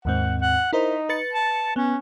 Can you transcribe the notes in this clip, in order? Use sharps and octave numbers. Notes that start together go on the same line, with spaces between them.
D#2 G#2 C4 F#5
F#5
D#4 E4 A#4 C5
B4 A6 C#7
A5
B3 C#4